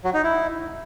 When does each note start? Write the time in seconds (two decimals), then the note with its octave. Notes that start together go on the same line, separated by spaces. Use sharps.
0.04 F#3
0.14 D#4
0.24 E4